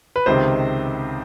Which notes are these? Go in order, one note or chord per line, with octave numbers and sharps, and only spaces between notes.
B4
C#2 C3 D#3 C5